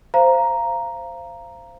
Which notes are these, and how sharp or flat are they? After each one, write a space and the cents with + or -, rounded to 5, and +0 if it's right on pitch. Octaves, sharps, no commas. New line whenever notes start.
C5 +0 F5 -25 A#5 +0